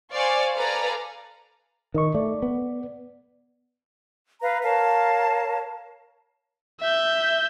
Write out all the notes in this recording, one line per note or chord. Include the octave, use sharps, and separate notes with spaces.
C5 D5 F5 G#5 C#6
A4 B4 D5 F5 G#5 A#5
D#3 A#4 D#5 C#6
A3 D5
B3
B4 F5 A#5
A#4 C#5 F5 A5
E5 G6